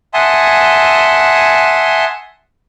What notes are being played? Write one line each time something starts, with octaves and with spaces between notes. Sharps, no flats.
E5 F#5 G#5 A5 C6 D#6